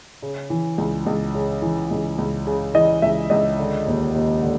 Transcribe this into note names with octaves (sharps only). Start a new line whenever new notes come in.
C#3
E3
C#2
C#2
C#3
E3
C#2
C#2
C#3
E3 D#5
C#2 E5
C#2 D#5
D3
D#2
D#2
D3